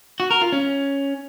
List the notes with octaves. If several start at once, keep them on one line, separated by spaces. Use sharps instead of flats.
F#4
A#4
F4
C#4